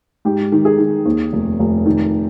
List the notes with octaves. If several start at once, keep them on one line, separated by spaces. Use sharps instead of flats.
G#2 G4
D#3
G#4
D#3
D#2
F1
F1
D#3